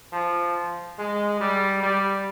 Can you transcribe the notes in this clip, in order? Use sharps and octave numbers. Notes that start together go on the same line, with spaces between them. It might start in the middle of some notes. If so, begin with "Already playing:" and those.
F3
G#3
G3
G3